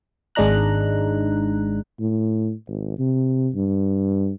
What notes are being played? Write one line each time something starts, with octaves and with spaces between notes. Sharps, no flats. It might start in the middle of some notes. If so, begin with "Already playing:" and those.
G#1 G#3 D4 D#4 A#5 F#6
A2
G#1
C3
G2